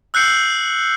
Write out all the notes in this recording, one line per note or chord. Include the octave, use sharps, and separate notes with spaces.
E6 F#6 G6 C7 C#7 F#7